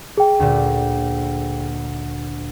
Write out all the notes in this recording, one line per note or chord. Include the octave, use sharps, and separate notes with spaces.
G#4 G5
D2 A#2